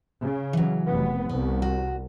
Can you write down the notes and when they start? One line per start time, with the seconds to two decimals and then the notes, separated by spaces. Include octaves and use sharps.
0.22 C#3
0.53 E3 F#3
0.86 F1 B3
1.29 C2 B3
1.62 F#4